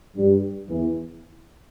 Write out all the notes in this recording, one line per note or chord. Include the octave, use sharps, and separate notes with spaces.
G2 G3
E2 E3